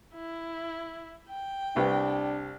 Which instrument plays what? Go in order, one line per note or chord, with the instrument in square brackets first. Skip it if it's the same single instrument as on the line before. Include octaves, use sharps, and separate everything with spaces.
[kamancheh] E4
G5
[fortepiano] C2 C3 B4 [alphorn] D4